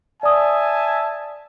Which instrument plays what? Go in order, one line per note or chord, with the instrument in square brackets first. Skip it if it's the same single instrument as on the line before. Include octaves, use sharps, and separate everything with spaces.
[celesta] D5 D#6 [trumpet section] E5 G#5 A5